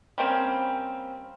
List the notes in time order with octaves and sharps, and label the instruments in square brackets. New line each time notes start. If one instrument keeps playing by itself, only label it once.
[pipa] G3 A#3 C4 C#4